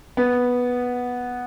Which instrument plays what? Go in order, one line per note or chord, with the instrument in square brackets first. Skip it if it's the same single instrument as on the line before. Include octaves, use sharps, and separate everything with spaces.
[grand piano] B3